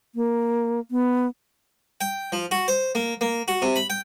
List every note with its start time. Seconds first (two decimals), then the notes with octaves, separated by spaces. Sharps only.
0.15 A#3
0.91 B3
2.01 G5
2.32 F3
2.51 F#4
2.68 C5
2.95 A#3
3.21 A#3
3.48 F#4
3.62 C3
3.76 B5
3.90 G5